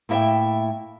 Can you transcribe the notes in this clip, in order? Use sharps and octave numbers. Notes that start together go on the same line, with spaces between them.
A2 A#3 E4 D#5 E5 G5